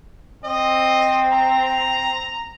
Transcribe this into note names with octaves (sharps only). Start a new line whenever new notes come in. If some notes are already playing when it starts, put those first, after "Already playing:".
C4 D#5
A#5